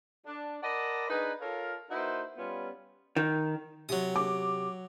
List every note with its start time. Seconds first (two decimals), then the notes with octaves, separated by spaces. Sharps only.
0.26 D4
0.63 A#4 D5 D#5 F#5 A5 B5
1.09 D4 D#4 G#4 B4
1.41 F4 A4 A#4 C#5 F5 A5
1.90 A#3 D#4 E4 F#4 B4 C5
2.37 G3 B3 C#4 F4
3.16 D#3
3.89 C3 F#3 G4 D#6
4.16 D6